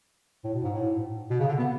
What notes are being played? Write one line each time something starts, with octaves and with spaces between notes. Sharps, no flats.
A2
B2
G#2
A2
B2
C#3
D3
B3